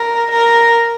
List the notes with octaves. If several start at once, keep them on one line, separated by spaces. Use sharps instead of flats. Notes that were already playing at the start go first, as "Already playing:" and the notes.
Already playing: A#4
A#4